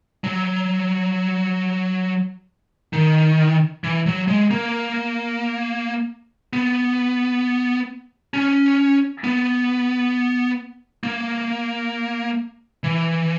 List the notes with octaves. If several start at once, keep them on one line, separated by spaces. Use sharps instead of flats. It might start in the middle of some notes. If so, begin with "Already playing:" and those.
F#3
D#3
E3
F#3
G#3
A#3
B3
C#4
B3
A#3
E3